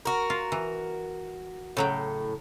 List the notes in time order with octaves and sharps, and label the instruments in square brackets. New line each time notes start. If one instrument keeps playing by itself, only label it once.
[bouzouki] F#4 A#4
[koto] F4
E3
[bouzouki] A2 [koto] C#3 F#3 G5